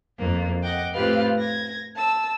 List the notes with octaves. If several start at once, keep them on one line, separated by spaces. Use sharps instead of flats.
F2 A#3
D#5 F#5 G5 D6
A2 C4 F4 G4 B4 F5
G#6 A#6
A5 E6